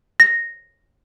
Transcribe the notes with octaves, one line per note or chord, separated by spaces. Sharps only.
A#6